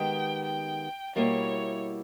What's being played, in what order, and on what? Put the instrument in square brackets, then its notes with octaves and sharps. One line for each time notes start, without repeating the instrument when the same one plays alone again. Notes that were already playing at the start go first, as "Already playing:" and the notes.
Already playing: [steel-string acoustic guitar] D#3 G#3 B3 G4 [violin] G5
[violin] G5
[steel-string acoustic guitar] B2 G3 A#3 E4 [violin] C#5